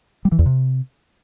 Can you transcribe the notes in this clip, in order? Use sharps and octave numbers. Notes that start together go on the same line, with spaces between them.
G3
E3
E2
C3